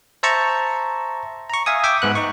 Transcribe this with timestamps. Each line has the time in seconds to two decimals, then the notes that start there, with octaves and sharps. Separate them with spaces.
0.23 C5 E5 A5 A#5 C#6
1.50 A#5 C#6
1.66 E5 F5 G#5 D#6
1.84 E5 G5 D6
2.02 G#2 B3 F#6
2.15 D#4 C#6